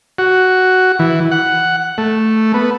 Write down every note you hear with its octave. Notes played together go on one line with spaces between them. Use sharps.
F#4
E3
F#5
A3
B3